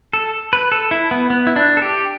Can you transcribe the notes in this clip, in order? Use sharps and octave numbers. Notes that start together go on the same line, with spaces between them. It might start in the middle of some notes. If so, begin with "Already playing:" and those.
A4
B4
A4
E4
B3
B3
E4
D4
A4
G4